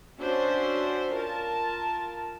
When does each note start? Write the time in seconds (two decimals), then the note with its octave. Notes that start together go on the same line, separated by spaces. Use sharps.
0.20 C#4 D4 F#4 C5 E5
1.14 F4 A#4 A5